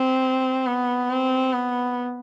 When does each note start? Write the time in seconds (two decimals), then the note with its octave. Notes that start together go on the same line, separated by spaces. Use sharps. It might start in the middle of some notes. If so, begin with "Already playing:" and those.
Already playing: C4
0.67 B3
1.10 C4
1.53 B3